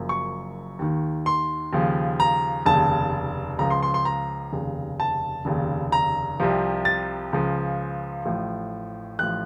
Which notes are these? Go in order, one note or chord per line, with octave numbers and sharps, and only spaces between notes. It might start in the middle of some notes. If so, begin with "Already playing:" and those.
Already playing: F#1 F#2 F3
C#6
D#2 D#3
C6
D#2 C#3 F3
A#5
F1 D#2 C#3 A5
C#2 C#3 F3 A#5
C6
C6
C6
A#5
F1 D#2 C#3
A5
F1 D#2 C#3
A#5
C2 C3 F3
A6
C#2 C#3 F3
A1 A2 F3
A1 A2 F3 F#6